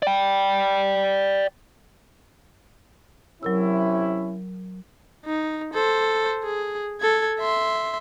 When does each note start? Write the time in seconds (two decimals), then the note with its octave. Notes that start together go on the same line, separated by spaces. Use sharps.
0.03 D5 G5
3.43 C3 F#3 C#4 E4 A#4 E6
5.25 D#4
5.73 A4 C5
6.44 G#4
7.01 A4 G#6
7.39 E5 C6